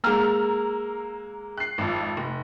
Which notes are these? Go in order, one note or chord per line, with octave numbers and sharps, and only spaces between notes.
G#3 A#3 A#5 E6 F6
F#6 C7
G#1 F2
F1